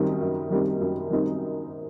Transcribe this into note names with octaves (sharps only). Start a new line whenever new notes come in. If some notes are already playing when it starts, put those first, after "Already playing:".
Already playing: F#2 D#3 G3 C4 D#4
F#2
D#3 G3 C4 D#4
F#2
D#3 G3 C4 D#4